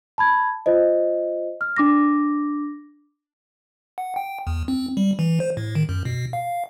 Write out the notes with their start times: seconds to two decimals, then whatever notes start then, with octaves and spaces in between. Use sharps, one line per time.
0.18 A5 B5 G#6
0.66 F4 C5 D#5
1.61 F6
1.77 D4 D6 A#6
3.98 F#5
4.16 G5
4.47 E2
4.68 C4
4.97 G3
5.19 E3
5.40 C5
5.57 A2
5.75 D#3
5.89 F#2
6.05 B2
6.33 F5